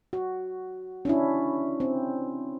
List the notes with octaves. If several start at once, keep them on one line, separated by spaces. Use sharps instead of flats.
F#4
C#4 D4 E4
C4